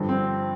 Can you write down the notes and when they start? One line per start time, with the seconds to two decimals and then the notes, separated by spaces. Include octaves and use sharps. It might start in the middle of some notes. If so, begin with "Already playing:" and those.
Already playing: G2 D3 F3
0.09 C4